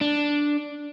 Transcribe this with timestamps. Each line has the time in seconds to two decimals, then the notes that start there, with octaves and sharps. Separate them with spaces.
0.01 D4